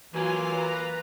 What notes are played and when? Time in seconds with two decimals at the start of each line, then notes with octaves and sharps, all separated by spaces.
0.14 E3 F#3 A#3 F4 G#5
0.56 B4 A#5